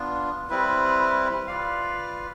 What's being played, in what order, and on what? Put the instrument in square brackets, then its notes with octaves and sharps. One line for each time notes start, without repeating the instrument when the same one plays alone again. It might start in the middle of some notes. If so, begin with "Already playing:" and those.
Already playing: [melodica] B3 D4 F4
G3 C4 E4 B4
F4 B4 D5 F5